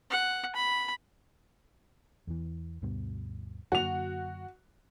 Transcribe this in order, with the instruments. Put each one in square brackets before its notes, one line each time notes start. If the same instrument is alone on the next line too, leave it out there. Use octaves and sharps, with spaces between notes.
[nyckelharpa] F#5
B5
[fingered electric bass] E2 E3
D2 G2 B2
[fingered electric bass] F#2 D3 A#3 [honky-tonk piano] F#4 F7